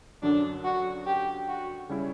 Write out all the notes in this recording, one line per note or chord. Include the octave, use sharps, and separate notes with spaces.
F#2 D3 F#3 D4
F#4
G4
F#4
C#3 G3 C#4 E4